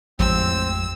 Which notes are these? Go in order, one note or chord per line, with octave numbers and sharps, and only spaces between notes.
A1 F2 F3 G#3 C4 E6